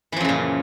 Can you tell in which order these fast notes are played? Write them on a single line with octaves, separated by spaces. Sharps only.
E3 F3 F#2 C#3 A#2